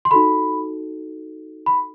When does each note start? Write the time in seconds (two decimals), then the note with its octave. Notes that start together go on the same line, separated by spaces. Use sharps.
0.05 C6
0.11 D#4 F#4 A4 B5
1.66 B5